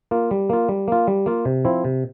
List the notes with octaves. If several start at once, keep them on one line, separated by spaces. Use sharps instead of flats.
A#3 F4
G3
A#3 F4
G3
A#3 F4
G3
A#3 F4
C3
F3 C4 E4
C3